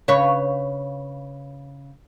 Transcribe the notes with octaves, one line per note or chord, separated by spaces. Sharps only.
C#3 B4 C#5